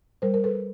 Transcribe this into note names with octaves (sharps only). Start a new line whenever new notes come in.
G3 A#4 C5
A#4
A4 B4